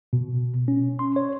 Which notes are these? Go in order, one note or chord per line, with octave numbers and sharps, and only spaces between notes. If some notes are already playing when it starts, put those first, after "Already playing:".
B2
C#4
C6
C#5